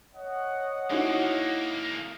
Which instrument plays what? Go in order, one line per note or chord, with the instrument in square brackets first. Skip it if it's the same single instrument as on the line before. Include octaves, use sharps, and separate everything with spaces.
[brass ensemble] C#5 D#5 F#5
[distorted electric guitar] G#3 A#3 [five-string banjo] D#4 E4 F#4